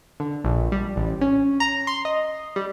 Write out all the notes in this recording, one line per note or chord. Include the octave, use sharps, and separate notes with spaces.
D3
A#1
G3
A1
C#4
A#5
C6
D#5
G3